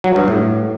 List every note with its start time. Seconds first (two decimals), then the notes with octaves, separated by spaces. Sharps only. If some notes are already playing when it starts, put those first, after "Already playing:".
0.04 F#3
0.16 G2
0.28 A2